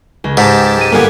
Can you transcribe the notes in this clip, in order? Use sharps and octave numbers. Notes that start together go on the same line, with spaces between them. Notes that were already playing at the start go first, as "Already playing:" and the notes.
C#2
G#2 G4 A5
G#3 D#7
G1 A#3 B3 G4 G#5